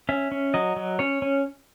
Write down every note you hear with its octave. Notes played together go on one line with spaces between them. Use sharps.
C#4 E5
C#4
F#3 D#5
F#3
C#4 C#5
C#4